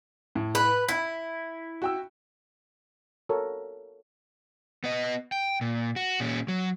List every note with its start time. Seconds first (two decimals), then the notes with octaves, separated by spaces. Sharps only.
0.36 A2
0.55 B4
0.89 E4 B6
1.82 F#4 G5 E6
3.29 F#4 A4 A#4 C#5
4.84 B3 D#5
5.32 G5
5.61 A#2
5.96 F#4
6.20 A#2 C#4
6.48 F#3